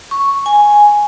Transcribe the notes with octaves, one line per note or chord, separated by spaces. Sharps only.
C#6
G#5